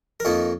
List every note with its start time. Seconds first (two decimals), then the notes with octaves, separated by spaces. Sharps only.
0.20 A#4
0.25 F2 F3 A#3 D#4 C#5